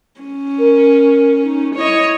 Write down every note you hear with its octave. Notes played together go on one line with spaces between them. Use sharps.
C#4
A#4
D#4
E4 C#5 D#5